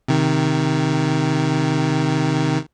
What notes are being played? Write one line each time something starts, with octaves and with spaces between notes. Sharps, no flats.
C3 D#3